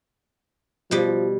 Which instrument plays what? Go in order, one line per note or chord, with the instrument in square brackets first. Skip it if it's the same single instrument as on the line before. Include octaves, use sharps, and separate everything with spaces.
[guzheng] B2 G3 [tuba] F3